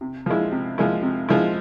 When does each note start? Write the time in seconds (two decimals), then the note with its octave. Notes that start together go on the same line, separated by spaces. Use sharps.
0.01 C3
0.26 F3 G#3 E4
0.51 C3
0.78 F3 G#3 E4
1.03 C3
1.29 F3 G#3 E4